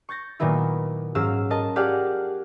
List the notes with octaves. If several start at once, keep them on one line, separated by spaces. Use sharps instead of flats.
C#6 G6 A6 A#6
A#2 D#3 F#3 B3 E4
G#2 F#3 C#4 F5 E6
A#4 D#5 A5
F4 G4 G#4 D5 F5 F#5